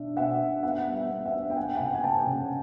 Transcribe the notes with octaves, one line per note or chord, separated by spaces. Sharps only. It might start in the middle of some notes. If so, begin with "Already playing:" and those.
Already playing: B2 D4 E5
B2 E5 F#5
D4
B3 E5 F#5
G3
E5 F#5
B3
E5 F#5
D4
G5
A#3 F#5 G#5
C#3 F#5
G5
G#5
A#3 G5 A5
C#3